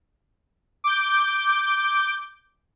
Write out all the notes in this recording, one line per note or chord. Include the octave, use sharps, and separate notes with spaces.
D6 G6